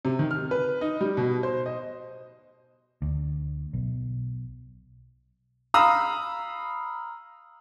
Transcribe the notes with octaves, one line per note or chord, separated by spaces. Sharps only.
C3
D#3
F6
B4
D#4
G3
B2
C5
D#5
D2
B1
F5 A#5 B5 D#6 E6